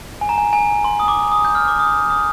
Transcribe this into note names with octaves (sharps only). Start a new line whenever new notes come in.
G#5
A#5
G#5
G#5
C6
D#6
D6
D#6
G6
F6
D6
D#6
D#6